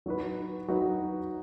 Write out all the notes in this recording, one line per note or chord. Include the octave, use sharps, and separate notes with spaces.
F#3 D#4 F#4 B4
F#3 D#4 F#4 B4